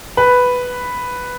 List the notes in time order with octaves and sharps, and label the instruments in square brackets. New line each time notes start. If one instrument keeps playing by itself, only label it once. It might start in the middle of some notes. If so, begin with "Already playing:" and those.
[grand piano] B4